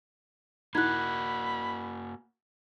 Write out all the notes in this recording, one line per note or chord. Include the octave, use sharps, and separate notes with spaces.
A#3 D#4 E4 F#4 B5 F#6 G#6